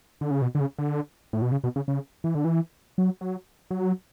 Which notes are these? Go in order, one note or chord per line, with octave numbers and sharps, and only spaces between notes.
D3
C#3
B2
D3
C#3
D3
A2
B2
C#3
B2
C#3
C#3
E3
D3
E3
F#3
F#3
F#3